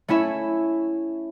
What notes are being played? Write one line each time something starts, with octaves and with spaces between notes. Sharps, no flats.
A3 C#4 E4 E5